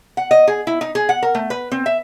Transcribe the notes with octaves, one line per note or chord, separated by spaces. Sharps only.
F#5
D#5
G#4
E4
D#4
G#4
F#5
A#4
A3
B4
C4
E5